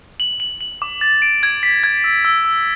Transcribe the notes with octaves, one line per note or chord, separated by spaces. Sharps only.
F#7
F#7
F#7
D6
A6
D7
G#6
B6
G#6
E6
E6
E6